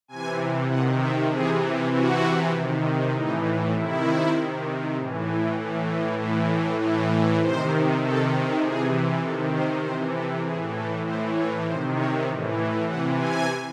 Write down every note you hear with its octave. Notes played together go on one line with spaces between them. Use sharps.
C3 E3 G#5
C3 D#3 F#5
E5
C3 E3 G#4
C3 E3 F#4
C3 D#3
A2 E3 D#4
C3 D#3 E4
C3 D#3
A2 E3
A2 E3
A2 E3
A2 E3
C3 D#3 C5
C3 D#3 A4
C3 E3 G#4
C3 D#3 A4
C5
C3 E3 C5
A4
A2 E3 G#4
A4
A2 E3 C5
C#5
C3 D#3 C5
C#5
A2 E3
C3 E3 F#5
G#5